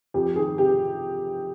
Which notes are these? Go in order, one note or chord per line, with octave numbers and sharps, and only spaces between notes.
F2 G4
D#3 G#4
C3 G4